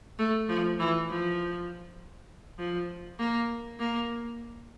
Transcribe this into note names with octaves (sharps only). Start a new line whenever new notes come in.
A3
F3
E3
F3
F3
A#3
A#3